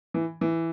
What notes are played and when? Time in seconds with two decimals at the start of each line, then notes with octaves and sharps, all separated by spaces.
0.14 E3
0.41 E3